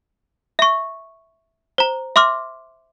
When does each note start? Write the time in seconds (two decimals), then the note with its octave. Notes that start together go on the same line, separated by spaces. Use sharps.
0.59 E5 C#6
1.78 C5 A#5
2.16 E5 C6 D6 F6